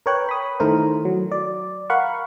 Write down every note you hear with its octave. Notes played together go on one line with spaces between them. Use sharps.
A#4 B4 C#5 G5 F#6
B5 D#6
D#3 A3 E4 A#4 C5
F#3
D5
A#4 F5 F#5 B5 C#6